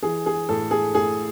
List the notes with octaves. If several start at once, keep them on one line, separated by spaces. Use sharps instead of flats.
E3 G#4
G#4
A2 A4
G#4
A2 G#4